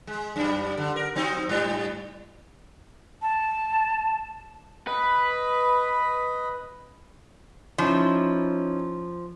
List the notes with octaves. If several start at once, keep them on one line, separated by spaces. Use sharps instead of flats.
G#3
F#2 G3
D3
A#4
F#3 C4 D#4
G#2 G3
A5
B4 D#5 B5
F3 C#4 D#4 E4